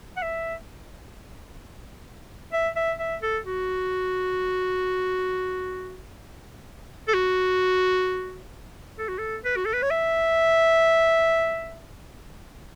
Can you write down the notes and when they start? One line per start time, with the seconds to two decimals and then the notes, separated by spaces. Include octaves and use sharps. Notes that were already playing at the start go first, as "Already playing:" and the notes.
0.17 F#5
0.22 E5
2.53 E5
2.76 E5
2.99 E5
3.22 A4
3.45 F#4
7.08 A4
7.14 F#4
8.99 A4
9.08 F#4
9.18 A4
9.45 B4
9.56 F#4
9.65 A4
9.73 B4
9.82 C#5
9.91 E5